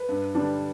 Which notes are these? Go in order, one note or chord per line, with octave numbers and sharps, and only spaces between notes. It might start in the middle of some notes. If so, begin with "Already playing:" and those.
Already playing: B4
G2
D3 G3 D4